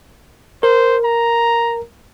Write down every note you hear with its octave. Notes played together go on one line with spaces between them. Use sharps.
A#4 C5
A#5